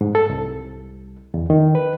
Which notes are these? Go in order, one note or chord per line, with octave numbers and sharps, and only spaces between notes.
G#2
A4
C2
E2
D#3
B4